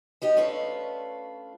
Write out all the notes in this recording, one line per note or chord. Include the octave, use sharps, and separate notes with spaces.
B3 D#4 G4
A3 C#4 D4 F4 B4